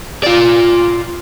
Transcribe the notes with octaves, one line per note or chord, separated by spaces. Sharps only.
F4 D5